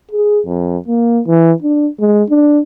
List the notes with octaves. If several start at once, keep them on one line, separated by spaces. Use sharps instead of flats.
G#4
F2
A#3
E3
D4
G#3
D4